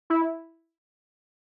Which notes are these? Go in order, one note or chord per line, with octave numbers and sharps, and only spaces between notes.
E4